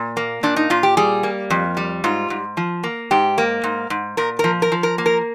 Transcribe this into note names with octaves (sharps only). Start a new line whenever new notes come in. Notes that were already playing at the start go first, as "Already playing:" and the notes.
Already playing: A#2
A#3
A#2 D4
D#4
A#2 F4
G4
G3 G#4
A#3
F2
G3
G#2 F4
G#2
F3
A#3
G#2 G4
A#3
G#2
G#2
A#2 A#4
F3 A#4
A#4
F3
A#4
A#3
A#4